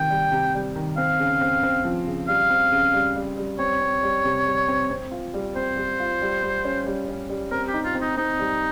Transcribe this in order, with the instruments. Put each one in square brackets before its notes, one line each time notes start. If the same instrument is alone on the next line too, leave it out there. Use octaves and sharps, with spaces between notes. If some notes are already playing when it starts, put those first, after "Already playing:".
Already playing: [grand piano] C3 D#3 [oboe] G5
[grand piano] G3
C3
G3
D#3
[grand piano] C4 [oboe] F5
[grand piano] C#3
C4
C4
F3
C#3
[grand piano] G3 [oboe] F5
[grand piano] C4
C#3
G3
G3
G3
[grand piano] C4 [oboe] C#5
[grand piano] C4
G3
C3
G3
C4
C4
F4
G3
[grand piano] C4 [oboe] C5
[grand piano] G3
F4
G3
G3
C#4
G3
C#4
G3
[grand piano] C4 [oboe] A#4
[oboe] G4
[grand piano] D#4
[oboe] F4
[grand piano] C4
[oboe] D#4
[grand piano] C4 [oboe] D#4
[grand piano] G3